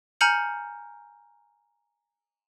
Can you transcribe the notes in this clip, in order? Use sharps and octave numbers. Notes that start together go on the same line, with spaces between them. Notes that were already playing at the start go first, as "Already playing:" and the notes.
G#5 A#5 F6 G6 C#7 F#7